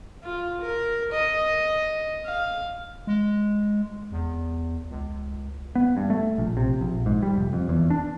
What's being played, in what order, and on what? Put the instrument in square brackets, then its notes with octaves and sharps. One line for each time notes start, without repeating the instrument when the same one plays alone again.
[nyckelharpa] F4
A#4
D#5
F5
[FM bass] G#3
E2
C#2
[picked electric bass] B3
G2
A3
A#1
C3
A#1
G#2
G3
F1
F2
E2
D4